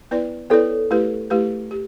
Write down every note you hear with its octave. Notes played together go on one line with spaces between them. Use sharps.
B3 E4 B4 D5
B3 E4 A4 B4 C#5 D5
A3 E4 G4 B4
A3 E4 G4 B4
G4